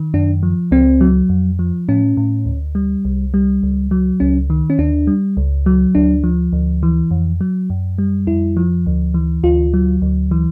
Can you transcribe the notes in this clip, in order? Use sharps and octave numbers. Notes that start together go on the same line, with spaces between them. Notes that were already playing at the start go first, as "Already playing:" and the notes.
Already playing: D#3
F#2 D4
F3
C#2 C4
F#3
F2
F3
A2 C#4
A2
D2
G3
C2
G3
C#2
F#3
C#2 C#4
D#3
C#4
D#2 D4
G3
C#2
F#3
D2 D4
F3
D2
E3
F2
F#3
F#2
G3
F2 E4
F3
D2
E3
D2 F4
F#3
D2
E3